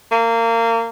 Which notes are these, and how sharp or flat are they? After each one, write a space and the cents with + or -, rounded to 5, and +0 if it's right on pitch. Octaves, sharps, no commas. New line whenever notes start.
A#3 -25